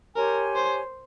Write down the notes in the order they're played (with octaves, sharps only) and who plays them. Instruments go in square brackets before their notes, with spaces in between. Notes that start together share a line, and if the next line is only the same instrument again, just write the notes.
[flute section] G4 C#5 G#5 C6 [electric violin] A#4
[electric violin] C5